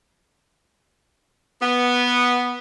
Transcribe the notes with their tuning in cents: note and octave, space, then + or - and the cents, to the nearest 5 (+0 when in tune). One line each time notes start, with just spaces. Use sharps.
B3 -5